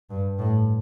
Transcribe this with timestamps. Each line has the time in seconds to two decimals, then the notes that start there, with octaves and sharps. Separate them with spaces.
0.10 G2
0.39 A2